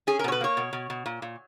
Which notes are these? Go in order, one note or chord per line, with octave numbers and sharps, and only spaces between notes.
C#4 G#4
A#4
B2 C#5
B4
A#3 C#5
B2
B2
B2
A#2
A#2